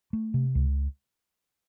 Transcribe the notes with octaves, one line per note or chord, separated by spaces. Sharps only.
A3
C3
C#2